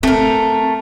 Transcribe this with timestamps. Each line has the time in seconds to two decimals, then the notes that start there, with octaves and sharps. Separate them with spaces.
0.03 A3 C4 A#4